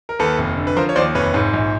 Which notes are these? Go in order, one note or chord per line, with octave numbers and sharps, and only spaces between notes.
A#4
D#2 A4 B4
F1
D3
B4
F3 A#4 C5
C#5
D#2 C5 D5
F1 B4 C#5
G#2
A#1